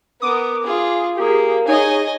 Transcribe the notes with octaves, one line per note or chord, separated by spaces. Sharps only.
B3 A#4 D6 D#6
F4 G#4
A#3 G4 G#4
D#4 G#4 C#5 D#5 G#5